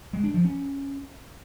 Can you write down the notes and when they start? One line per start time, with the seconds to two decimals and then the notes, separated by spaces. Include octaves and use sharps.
0.13 G#3
0.24 D4
0.34 F3
0.45 C#4